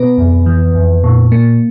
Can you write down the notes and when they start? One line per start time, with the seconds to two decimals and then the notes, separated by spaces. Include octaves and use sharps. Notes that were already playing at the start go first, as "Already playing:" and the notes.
Already playing: B2 B3 B4
0.18 F2
0.46 E3
0.75 F2
1.04 A#2
1.32 A#3